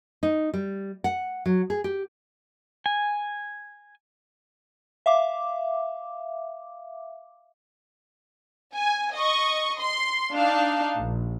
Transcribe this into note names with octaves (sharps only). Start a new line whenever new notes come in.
D#4
G3
F#5
F#3
G#4
G4
G#5
E5 F5 D6
G#5
D#5 C#6
C6
D4 D#4 F5 A5
A#1